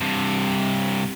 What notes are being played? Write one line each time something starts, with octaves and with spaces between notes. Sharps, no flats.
G2 C3